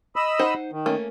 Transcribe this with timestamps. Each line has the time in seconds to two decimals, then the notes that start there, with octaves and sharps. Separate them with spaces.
0.16 D#5 B5 E6
0.39 D#4 C5 F#5
0.71 D#3
0.86 A3 A#3 C#4